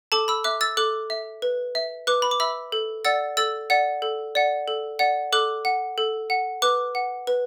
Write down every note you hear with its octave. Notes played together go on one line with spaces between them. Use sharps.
A4 A5 D6
B5 E6
E5 D6 F#6
E6 A6
A4 D6 F#6
E5
B4
E5
B4 D6 F#6
B5
D6
E5 B5 E6
A4
D5 F#5 E6 A6
A4 E6 A6
D5 F#5
A4
D5 F#5
A4
D5 F#5
A4 D6 F#6
F#5
A4
F#5
B4 D6 F#6
F#5
B4